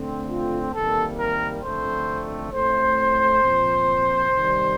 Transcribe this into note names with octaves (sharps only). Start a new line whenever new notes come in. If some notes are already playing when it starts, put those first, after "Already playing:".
Already playing: D3 A3 C4
F4
C3 D#3 G3 A#3 A4
A#4
F2 D3 A3 C4 C5
A2 A3 C4 C5
A#2 F3 C4
C3 D#3 G3